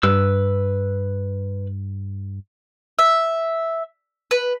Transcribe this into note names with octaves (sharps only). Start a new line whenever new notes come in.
G2 B4 E6
E5
B4